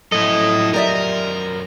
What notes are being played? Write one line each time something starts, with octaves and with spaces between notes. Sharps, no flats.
F#2 F3 E4 A4 D#5
G4 A#4 D5 E5